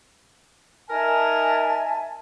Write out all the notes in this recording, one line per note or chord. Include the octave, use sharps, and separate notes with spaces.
D#4 A#4 E5 G#5 A5